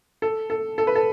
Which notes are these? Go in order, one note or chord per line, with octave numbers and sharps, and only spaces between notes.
A4
A4
A4
B4
A4